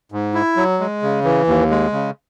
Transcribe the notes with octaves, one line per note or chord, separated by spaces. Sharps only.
G#2
E4
F#3
G#3
C#3
E3
D#2
G#3
C#3